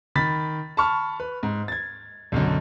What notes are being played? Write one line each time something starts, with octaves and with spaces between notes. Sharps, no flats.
D#3 B5 A6 B6
A5 B5 C#6 F6
B4
G#2
G#6 A6
B1 F#2 D3